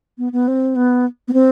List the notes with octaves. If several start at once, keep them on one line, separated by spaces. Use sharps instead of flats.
B3
B3
C4
B3
B3
C4